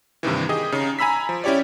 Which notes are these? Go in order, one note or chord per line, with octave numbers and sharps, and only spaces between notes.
G2 C3 D#3 E3
G4 G#4 D#5
C#3 D#4
G#5 A#5 B5 E6 B6
F3
C#4 E4 G4 C#5 D5